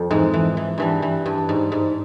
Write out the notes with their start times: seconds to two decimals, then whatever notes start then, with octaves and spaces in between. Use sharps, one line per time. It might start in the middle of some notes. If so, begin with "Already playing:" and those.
Already playing: F2
0.11 G#2 E3 G#3
0.34 E3
0.57 E3
0.78 G2 E3 G3
1.02 E3
1.26 G2
1.49 G#2
1.72 G#2